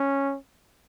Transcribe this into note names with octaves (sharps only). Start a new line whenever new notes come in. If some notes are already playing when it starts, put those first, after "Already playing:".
Already playing: C#4